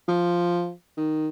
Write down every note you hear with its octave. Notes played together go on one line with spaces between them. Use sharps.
F3
D#3